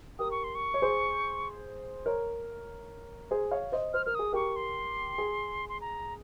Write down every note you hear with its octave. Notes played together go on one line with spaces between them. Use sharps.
G4 A#4 D#6
C#6
C6
C#6
C#5
G#4 C5
A#4 C#5
G#4 C5
C#5 F5
C5 D#5
C5 F6
A#4 F6
G#4 D#6
G4 A#4 C#6
C6
G#4
C6
A#5